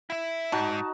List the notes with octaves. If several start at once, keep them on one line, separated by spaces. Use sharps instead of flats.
E4 E5
G#2 D#4 F#4 A5